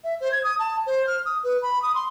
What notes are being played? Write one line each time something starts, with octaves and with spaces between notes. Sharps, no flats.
E5
C5
G#6
D#6
A5
C5
F6
D#6
B4
B5
D#6
C6